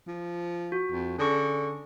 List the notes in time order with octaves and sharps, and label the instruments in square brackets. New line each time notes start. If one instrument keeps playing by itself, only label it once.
[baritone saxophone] F3
[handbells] F#4
[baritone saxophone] F2
[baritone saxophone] D3 [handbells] C#4 G#4 C#6